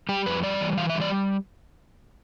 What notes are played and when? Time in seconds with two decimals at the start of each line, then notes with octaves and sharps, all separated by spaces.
0.09 G3 G4
0.26 F2 B4
0.43 G3 D5
0.61 E3
0.77 E3 F5
0.90 E5
0.95 G3
1.01 D5